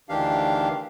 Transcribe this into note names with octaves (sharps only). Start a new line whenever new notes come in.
D2 D#3 E3 D4 G4 F5